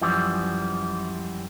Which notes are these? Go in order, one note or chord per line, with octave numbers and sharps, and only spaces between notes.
F#2 E3 F3 G3